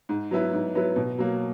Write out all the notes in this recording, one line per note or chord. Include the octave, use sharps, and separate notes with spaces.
G#2
F#3 B3 E4 B4
G#2
F#3 B3 E4 B4
B2
F#3 A#3